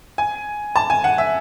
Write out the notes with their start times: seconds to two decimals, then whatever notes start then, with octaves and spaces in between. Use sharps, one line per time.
0.18 G#5
0.76 A5
0.90 G#5
1.04 F#5
1.18 E5